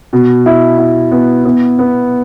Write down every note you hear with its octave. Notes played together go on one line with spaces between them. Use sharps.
B2
E4
E4
B3
B3
B3